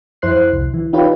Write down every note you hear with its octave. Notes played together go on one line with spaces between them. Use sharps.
F2 E4 C5 F#6 C7
C2
E3
D#4 F4 G4 B4 C#5